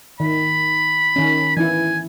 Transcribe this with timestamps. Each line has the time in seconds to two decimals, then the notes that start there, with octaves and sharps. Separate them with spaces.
0.20 D#3 B5
1.16 D#3 C#4
1.57 E3 E4 G#5